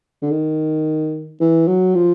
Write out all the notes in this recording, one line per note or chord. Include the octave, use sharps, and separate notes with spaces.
D3
D#3
E3
F#3
F3